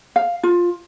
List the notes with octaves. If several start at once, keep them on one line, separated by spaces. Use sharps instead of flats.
F5
F4